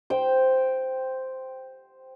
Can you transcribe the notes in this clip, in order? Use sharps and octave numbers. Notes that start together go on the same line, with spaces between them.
C5 G5